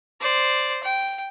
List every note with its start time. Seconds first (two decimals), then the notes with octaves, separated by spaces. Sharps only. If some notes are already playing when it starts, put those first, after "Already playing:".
0.21 C5 D5
0.84 G5